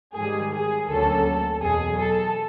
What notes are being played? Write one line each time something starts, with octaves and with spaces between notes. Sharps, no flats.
G#2 D#3 G3 G#4
G#4
D2 D3 F#3 A#3 C#4 A4
E2 B2 F#3 G#4
A4